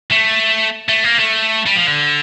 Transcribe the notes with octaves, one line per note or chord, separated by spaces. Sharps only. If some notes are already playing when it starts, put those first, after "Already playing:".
A3
A3
A#3
A3
G3
F3
D3